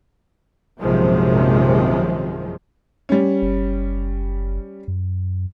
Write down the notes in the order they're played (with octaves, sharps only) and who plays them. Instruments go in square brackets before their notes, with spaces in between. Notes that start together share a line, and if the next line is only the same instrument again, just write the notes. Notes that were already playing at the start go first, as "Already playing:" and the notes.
[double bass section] A#1 F#2 C3 D#3 F3 G#3
[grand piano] G3 C#4
[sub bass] F#1
F#2